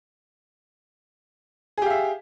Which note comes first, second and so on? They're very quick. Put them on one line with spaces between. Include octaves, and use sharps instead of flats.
G#4 G4 F5 E5